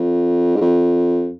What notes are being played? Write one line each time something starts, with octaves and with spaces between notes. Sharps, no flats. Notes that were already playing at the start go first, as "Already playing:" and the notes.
Already playing: F2
G#2
F2